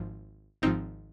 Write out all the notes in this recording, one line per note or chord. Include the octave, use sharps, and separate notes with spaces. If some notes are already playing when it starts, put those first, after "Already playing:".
Already playing: G#1 G#2 F3
G#1 G#2 F3 C4 D#4